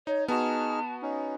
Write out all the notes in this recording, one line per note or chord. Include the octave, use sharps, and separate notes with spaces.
D#4 C#5
B3 D#4 F#4 G#4 A5 F6
C#4 D#4